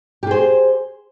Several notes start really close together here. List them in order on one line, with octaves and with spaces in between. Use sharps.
G4 G#4 C5